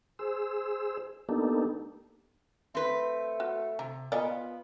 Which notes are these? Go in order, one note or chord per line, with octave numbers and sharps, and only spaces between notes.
G#4 C5 E6
A#3 B3 D4 D#4 G4 A4
A3 C4 B4
F#4
C3 A#5
A#2 B3 D5 D#5 G#5
F4